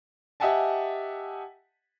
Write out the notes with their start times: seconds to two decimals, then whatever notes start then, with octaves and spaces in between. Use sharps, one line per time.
0.40 G4 D#5 E5 F#5 G#5 A5